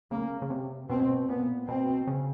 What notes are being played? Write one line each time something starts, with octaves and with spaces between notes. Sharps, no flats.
C#3 A#3
C#3
C3
B2 C4
A#2 B3
B2 C4
C#3